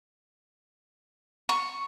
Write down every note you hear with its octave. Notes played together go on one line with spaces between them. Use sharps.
C#6